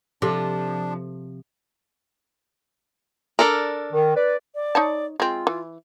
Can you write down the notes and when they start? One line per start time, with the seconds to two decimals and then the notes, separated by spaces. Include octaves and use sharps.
0.22 C3 F3 D4 A4
3.39 D4 A4 A#4
3.92 D#3
4.15 B4 D5
4.55 D5
4.75 D#4 C#5 A5
5.20 G#3 C4 F4
5.47 E3